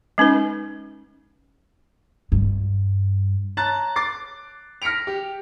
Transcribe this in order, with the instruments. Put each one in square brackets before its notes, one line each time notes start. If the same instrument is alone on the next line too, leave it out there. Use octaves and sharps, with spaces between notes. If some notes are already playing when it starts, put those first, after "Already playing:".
[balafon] G#3 C#4 D#4 B4
[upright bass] G2
[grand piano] C#5 A5 A#5 F#6 A6
D6 A6 C7
F6 A#6 B6 C#7 D7 F7
G4